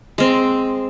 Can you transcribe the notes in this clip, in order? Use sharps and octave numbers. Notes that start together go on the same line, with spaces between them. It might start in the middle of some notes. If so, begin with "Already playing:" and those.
G#3 C4